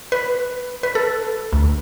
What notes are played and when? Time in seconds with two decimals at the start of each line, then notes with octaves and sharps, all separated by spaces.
0.12 B4
0.83 B4
0.95 A4
1.53 D2